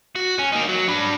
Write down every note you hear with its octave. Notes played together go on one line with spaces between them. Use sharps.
F#4
C#4
A#3 D#4
F#3
D4 B5